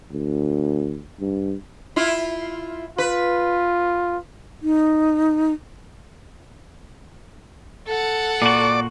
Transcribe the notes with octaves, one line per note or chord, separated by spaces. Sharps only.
D2
G2
E4 F4
F4 B4
D#4
A4 F#5
A#2 F#4 D5